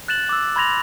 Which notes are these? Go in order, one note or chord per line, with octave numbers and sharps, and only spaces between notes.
F#6 A6 E7 F#7
D6 E6
B5 C6 G#6 A#6 F7 F#7